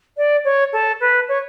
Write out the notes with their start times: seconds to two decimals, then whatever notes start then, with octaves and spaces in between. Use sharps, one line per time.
0.17 D5
0.44 C#5
0.73 A4
1.00 B4
1.28 C#5